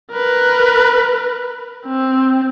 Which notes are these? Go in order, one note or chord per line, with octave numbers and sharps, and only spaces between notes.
A#4 B4
C4